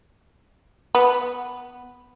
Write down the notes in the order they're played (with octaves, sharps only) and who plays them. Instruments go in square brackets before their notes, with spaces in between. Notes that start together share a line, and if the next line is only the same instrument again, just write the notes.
[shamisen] B3